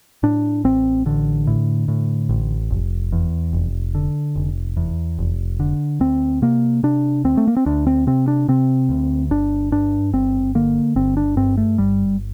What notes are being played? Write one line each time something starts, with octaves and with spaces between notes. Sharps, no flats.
A2 D4
A1 C4
A1 D3
A2
A2
A1
F1
E2
F1
D3
F1
E2
F1
D3
D2 C4
C3 A#3
C3 D4
D2 C4
A3
A#3
C4
D2 D4
C4
C3 C4
D4
C3 C4
D2
G1 D4
G2 D4
G1 C4
D3 A#3
G1 C4
D4
G2 C4
A3
G1 G3